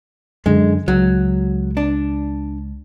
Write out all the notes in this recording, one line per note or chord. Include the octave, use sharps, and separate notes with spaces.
F#2 D3 G#3
C#2 F#3
D4